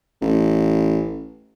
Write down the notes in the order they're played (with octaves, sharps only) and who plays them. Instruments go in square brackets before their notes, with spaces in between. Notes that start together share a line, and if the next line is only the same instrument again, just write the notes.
[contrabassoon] A1